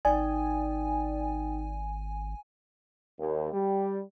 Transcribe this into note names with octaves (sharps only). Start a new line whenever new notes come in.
G#1 D#4 D5 G5 G#5
D#2
G3